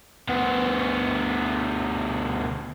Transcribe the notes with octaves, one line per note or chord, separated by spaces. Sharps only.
D2 B3